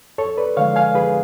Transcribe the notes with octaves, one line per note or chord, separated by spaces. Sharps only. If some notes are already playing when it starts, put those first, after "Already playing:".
F2 A4 C#5
B4 D5
D3 F3 G#3 C#5 F5
F5 G#5
F2 G#4 B4